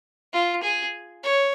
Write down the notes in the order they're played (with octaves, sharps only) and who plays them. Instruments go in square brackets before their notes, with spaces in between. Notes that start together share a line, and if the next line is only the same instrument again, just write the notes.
[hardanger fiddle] F4
G#4
C#5